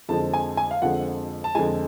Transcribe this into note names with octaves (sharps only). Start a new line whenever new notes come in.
F2 D3 F3 G#3 A5
G#5
G#5
F5
F2 D3 F3 G#3 F#5
A5
F2 D3 F3 G#3 G#5